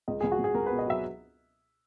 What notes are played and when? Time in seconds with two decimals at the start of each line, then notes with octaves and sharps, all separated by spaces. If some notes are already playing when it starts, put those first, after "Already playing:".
0.08 C#2 D#5
0.21 C#2 G#4
0.32 F#4
0.39 C#2
0.44 G#4
0.54 C#2 A#4
0.66 B2 B4
0.79 D#5
0.86 F#3 E5